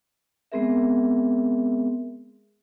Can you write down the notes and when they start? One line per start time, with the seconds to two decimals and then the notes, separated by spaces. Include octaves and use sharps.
0.52 G#3 B3 C4 G#4 A#4 E5